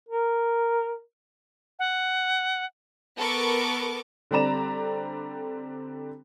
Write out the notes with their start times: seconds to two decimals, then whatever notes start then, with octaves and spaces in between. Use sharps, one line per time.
0.09 A#4
1.79 F#5
3.16 B3 A4 A#4 C#6 D6
4.31 D3 G3 C4 D5 A#5 E7